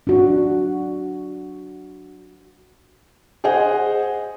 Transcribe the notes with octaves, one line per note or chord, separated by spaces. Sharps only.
D4 F#4
G#4 C5 D#5 F#5 G#5